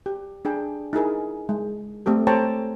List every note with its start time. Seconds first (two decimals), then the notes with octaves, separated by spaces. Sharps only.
0.06 G4
0.45 D4 G#4 G5
0.93 D#4 E4 G#4 A#4
1.49 G#3
2.06 A3 C4 G4 A4
2.27 A4 C5 C#5 G5 A5 A#5